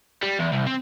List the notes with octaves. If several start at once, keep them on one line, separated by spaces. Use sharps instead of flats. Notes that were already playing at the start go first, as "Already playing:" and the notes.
G3
E2
C2
C4